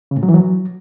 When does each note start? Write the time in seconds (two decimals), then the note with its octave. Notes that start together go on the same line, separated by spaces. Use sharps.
0.11 C#3
0.17 A2
0.23 F#3
0.29 E3
0.34 F#3